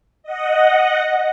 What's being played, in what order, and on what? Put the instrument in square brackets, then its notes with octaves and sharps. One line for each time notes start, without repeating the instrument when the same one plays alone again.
[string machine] D#5 F#5